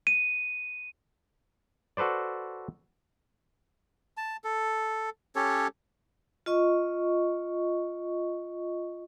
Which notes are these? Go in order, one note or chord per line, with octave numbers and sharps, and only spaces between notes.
D#7
F#4 A4 B4 C5 D5
A5
A4
C#4 G4 A4 C#5
F4 D#5 C#6